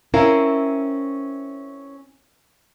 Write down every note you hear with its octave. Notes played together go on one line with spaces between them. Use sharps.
C4 C#4 E4 A#4 C#5 F5